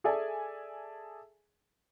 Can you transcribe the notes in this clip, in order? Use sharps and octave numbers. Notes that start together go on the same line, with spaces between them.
G#4 A4 D5 E5 G#5 A5